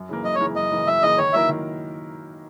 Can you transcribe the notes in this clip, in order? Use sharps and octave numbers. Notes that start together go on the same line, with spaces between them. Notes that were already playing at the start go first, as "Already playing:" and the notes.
Already playing: F#2
C#3 E3 A#3
F#2 D#5
C#5
C#3 E3 A#3
F#2 D#5
C#3 E3 A#3
F#2 E5
C#3 E3 A#3 D#5
D#3 C#5
F#3 A#3 E4 A#4 E5
D#3